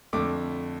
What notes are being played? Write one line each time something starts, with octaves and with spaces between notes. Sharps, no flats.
F2 D3 A3 D6